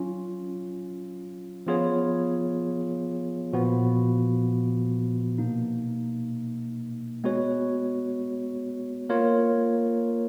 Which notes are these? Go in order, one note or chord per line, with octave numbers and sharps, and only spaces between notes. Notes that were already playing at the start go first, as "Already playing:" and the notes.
Already playing: F#3 C#4 F4
F3 B3 F4 G#4 C#5
A#2 F3 B3 F#4
B2 A#3 D#4
G#3 B3 F#4 C#5
A#3 F4 A#4 C#5